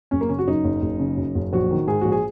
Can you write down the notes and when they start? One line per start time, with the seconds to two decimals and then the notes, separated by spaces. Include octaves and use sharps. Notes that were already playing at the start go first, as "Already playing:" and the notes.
0.11 F#1 C#4
0.21 A#3
0.29 C#3 C#4
0.39 F#4
0.47 F#2 D#4
0.64 F#1
0.82 F#1
1.00 C#3
1.17 F#2
1.35 F#1
1.53 A#1 F#4
1.71 D#3
1.87 G#2 G#4
2.01 A#1 F#4
2.12 G#4